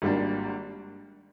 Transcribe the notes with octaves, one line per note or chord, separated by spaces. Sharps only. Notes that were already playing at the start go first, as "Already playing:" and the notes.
G#1 G#2 G3 A#3 D4